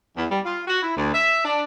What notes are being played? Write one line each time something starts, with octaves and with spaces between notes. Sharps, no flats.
E2
G3
F4
F#4
E4
D2
E5
D4